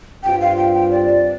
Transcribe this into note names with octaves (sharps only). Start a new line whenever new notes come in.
G2 G3 C4 F4 G5
F5
G5
G5
D5